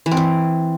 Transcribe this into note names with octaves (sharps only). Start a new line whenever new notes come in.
E3
C4
E3